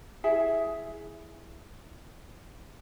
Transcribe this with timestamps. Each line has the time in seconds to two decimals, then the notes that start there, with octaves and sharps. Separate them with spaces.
0.24 E4 G#4 E5 G#5